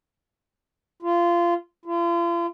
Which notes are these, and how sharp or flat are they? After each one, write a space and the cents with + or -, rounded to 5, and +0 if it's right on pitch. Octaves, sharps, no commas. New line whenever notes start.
F4 -20
F4 -40